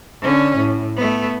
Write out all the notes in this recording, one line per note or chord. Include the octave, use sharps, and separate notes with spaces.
D3 C#4
A2
A3 B3